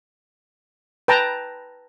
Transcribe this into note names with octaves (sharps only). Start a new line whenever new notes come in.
B4 G5 A5 A#5